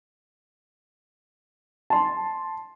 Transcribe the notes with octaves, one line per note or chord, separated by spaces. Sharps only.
A5 C6